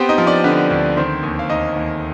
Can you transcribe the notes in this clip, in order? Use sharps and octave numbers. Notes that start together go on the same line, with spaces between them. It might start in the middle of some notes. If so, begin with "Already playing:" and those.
Already playing: B3 C4 G4 G5
D#4 D#5
F3
D4 D5
D3 B3 B4
D2
D#3 C4 C5
D#2
F5
D#2 D#4 D#5
D#2